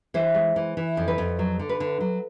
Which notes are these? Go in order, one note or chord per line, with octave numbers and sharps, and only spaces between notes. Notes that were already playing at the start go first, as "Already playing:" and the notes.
E3 C5
G#3
E3
E3
F2
B4
F2
F#3
D3
B4
D3
F#3